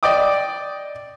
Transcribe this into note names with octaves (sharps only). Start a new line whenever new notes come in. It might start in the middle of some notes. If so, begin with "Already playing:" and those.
D5 D#5 G5 D6 D#6